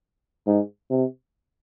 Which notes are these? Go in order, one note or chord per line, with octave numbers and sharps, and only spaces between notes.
G#2
C3